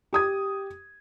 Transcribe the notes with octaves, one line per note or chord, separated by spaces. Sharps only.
G4 D#6 G#6